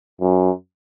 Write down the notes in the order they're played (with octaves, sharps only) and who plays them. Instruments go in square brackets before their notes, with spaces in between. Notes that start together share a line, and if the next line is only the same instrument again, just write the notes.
[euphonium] F#2